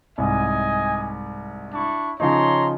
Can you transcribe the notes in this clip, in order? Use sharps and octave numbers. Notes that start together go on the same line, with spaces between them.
C2 G#2 D#5 G#5
D4 E4 C#6
C#3 F3 D#4 C#5 A#5 C6